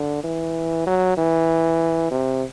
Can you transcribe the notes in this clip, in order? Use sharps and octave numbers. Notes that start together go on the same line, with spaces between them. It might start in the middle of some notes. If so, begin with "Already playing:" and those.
Already playing: D3
E3
F#3
E3
C3